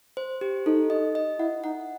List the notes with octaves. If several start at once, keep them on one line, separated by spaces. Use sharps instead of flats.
C5
G4
D#4 A4
D#5
D#5
E4 F#5
D#4 F#5